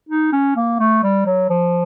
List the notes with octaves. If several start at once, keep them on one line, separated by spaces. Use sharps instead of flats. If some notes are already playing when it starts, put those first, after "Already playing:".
D#4
C#4
A#3
A3
G3
F#3
F3